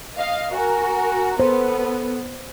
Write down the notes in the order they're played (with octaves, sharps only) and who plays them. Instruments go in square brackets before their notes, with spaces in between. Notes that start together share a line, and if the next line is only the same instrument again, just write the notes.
[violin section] D#5 F5
[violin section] F#4 A#4 [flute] G#5
[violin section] B3 [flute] A4 [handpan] C5